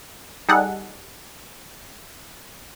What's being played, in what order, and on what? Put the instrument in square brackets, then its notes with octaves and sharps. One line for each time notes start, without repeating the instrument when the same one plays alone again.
[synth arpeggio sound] G3 D#4 G#4 A4 F#5